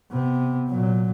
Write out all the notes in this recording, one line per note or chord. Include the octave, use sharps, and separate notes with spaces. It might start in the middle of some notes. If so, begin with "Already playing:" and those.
C3 B3
A#2 F#3